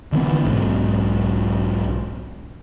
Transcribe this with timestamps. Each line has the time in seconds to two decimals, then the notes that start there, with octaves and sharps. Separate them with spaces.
0.12 D3 E3 A#3 B3
0.45 B1 G#2